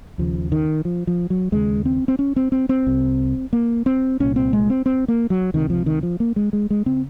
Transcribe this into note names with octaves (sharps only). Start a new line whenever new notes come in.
D#2 C#3 F3
D#3
F3
F3
F#3
D#2 C#3 G#3
C4
C4
C#4
C4
C4
C4
C2 C3
A#3
C4
C2 A#2 C#4
C4
G#3
C4
C4
A#3
F#3
C#2 C3 D#3
F3
D#3
F3
A#3
G#3
G#3
G#3
C#3 C4